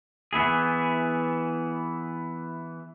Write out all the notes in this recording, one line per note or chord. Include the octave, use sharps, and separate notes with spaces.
E3 B3 E4 G#4